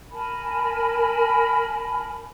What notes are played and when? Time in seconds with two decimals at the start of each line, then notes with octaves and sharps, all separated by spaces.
0.11 A#4 G#5 A5 B5